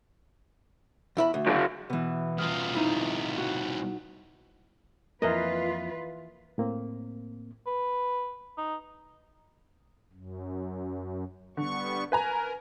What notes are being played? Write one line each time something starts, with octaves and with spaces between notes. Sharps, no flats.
E2 E4 B5
D2
F#2 C#3
B2 E3
C2 F4 D#6 F6
D#4 E4
F#4
F2 E3 A#3 F4 A#4 B4 D#5
A2 A#3 C4
B4
D#4
F#2
D3 G3 B3 C#6
A#4 B4 G#5 A#5